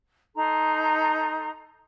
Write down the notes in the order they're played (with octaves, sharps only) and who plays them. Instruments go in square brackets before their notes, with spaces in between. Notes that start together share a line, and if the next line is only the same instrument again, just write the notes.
[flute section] D#4 A4 A#5 C6